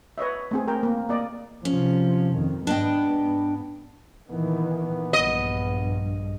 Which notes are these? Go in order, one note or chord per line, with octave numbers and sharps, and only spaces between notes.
B4 C#5 D#5 E5
A3 C4 G#4
A#4 G5
A#3
A#3 D5 D#5
C3 F3 C#4
F2 D#3
G#2 B3 D4 D#5 G5
A#2 D#3 E3 B3
A#1 G2 D#5